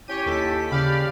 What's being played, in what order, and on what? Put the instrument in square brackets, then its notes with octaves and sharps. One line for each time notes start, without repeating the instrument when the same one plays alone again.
[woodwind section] C#4 E4 G4 [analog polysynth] C#5 G5 D#7
[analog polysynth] D#2 A4 B6
[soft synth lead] C#3 [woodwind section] G4 [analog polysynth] D5 F5 B5